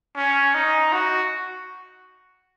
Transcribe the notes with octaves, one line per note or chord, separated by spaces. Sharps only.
C#4
D#4
F#4